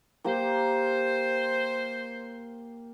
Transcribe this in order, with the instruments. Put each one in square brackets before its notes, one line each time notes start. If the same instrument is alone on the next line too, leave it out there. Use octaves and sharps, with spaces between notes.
[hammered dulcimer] A#3 G4 A#4 [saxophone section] C5